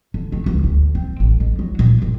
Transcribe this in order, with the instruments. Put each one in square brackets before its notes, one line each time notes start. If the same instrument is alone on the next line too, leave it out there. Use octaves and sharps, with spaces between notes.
[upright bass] D3
A3
C#2
D2
C4
A1
F2
F#3
A#2
G1